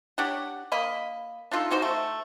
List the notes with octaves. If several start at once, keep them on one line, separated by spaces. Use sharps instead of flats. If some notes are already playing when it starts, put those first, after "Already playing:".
D4 G4 C#5 F#5
A#3 D#5 B5
D4 D#4 F4 A4
C#3 D#4 F#4 C5
A3